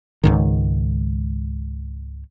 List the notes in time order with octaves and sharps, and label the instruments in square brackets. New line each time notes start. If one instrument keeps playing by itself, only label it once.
[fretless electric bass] C#2 G#2 D#3